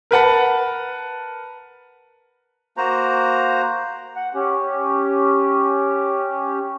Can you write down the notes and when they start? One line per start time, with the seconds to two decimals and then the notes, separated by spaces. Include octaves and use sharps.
0.11 A#4 B4 F#5 A5
2.77 A#3 F#4 C5 A#5
4.16 F#5
4.35 C#4 G4